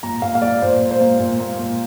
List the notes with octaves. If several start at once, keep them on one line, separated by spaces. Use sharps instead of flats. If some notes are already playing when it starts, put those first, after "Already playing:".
A#2 A#5
A#2 F5
F5
A#3 D5
A#2 C5
A#2
C5
A#3
A#2
A#3
A#2